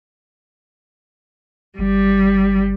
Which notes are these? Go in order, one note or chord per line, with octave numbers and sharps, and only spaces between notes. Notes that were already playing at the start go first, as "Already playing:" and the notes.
G1 G3